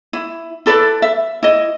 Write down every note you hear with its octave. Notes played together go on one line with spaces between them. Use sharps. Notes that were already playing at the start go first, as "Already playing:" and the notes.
E4
E4 A4 B4 D5
E5
E4 D#5